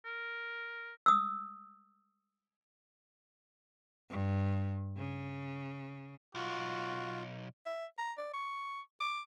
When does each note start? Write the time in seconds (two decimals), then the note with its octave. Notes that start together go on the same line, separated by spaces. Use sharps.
0.05 A#4
1.06 D#6 E6
4.10 G2
4.97 C#3
6.35 B1 F4 F#4
7.66 E5
7.98 A#5
8.18 D5
8.34 C#6
9.00 D6